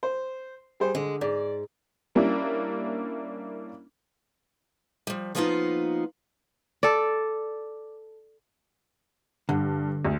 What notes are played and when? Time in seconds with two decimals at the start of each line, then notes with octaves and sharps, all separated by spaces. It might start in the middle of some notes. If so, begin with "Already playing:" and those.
0.03 C5
0.80 G3 G#4 C5
0.95 D3 G#3
1.21 G#2 D5
2.15 G3 A#3 C#4 D4 E4
5.07 F3 G3
5.35 F3 G3 A#3 B3 D#4 F4
6.83 A4 D5
9.49 G2 D3
10.05 D2